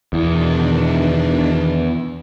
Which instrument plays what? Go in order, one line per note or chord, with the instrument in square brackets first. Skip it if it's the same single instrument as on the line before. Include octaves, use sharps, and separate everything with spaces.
[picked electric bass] E2 [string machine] B2 D#3 D4